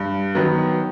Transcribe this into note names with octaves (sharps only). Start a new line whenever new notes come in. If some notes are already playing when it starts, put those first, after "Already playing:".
Already playing: G2
D#3 F#3 B3